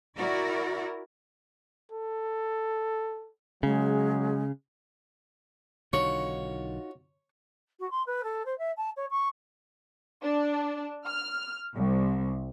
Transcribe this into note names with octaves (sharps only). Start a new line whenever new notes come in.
E4 F#4 A#4 D5
A4
C#3 F#3 G#3
B1 D3 D#3 D#4 F4 F#4 C#5 C#6
F#4
C6
B4
A4
C5
E5
A5
C#5
C#6
D4
F6
C2